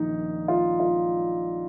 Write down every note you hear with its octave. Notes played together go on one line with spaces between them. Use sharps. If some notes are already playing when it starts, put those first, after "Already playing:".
Already playing: A#1 D#3 D#4
F4
F4